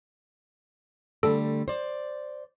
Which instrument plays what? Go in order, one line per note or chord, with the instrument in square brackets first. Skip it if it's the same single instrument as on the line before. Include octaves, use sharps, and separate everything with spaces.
[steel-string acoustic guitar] D3 G3 A3 [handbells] A4
[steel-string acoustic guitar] C5 D5